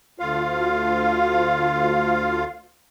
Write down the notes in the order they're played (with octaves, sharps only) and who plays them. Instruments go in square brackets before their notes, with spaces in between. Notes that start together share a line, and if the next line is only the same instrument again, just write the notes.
[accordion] D2 F4 F5